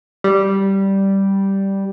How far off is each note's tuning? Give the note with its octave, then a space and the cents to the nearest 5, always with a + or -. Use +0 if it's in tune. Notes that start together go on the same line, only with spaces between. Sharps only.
G3 -5